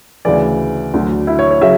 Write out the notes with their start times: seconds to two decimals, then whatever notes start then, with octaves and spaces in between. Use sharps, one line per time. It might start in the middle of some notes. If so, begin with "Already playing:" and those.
0.25 D2 C#3 E3 D5
0.94 D2 D3 F#3
1.27 E4
1.39 C#5
1.51 C#5
1.61 C#3 F#3 E5